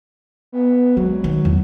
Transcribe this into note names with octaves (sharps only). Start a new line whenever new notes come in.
B3
F#3 G#3
D#3
E2